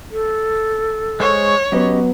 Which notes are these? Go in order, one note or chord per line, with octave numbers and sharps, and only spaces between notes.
A4
G#3 C5 C#5 C#6
F#3 B3 C#4 G4 D#5